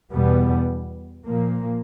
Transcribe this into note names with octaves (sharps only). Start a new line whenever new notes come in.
E2 B2 G3 B3
A#2 F3 A#3